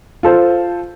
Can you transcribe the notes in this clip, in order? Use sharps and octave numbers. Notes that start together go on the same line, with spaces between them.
F4 A4 C5